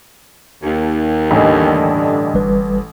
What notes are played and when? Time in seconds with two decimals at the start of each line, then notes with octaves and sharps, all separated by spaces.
0.63 D#2
1.31 A1 G2 D3 D4 A4 D#5 G5 G#5
2.34 G1 G3 B4